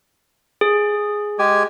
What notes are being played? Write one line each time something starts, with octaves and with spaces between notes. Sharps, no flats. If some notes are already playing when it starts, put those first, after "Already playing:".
G#4
G#3 G4 G#5